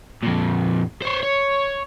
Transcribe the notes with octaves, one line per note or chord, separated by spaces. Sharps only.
F2 A#2
C5 C#5
C#5